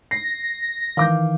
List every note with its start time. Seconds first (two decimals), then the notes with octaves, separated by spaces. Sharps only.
0.11 A#6 C7
0.97 D#3 E3 F5 D6 G6